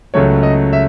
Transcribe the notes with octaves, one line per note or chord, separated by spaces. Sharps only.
C#2 C#3 F#3 A3 C#5
D#5
E5